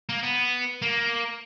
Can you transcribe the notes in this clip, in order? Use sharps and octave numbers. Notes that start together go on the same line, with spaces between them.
A#3
B3
A#3